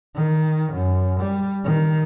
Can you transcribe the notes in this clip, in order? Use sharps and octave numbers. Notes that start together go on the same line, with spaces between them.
D#3
F#2
G3
D#3